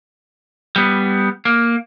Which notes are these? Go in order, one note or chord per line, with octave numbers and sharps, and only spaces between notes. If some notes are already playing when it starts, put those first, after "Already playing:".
G3 B3
A#3